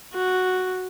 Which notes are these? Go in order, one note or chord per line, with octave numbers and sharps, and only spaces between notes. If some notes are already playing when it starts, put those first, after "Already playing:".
F#4